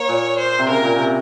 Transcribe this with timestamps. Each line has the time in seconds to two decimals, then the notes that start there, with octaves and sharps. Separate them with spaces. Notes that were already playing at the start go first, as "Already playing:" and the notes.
Already playing: A#3 C#5
0.09 A#2
0.38 C5
0.59 C3
0.69 C#3 A#4
0.84 A#2
0.98 C3